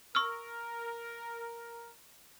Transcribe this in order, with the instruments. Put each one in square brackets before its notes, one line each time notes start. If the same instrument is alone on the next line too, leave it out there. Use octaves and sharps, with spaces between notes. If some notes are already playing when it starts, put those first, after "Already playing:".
[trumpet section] A#4 [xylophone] C#6 E6 F6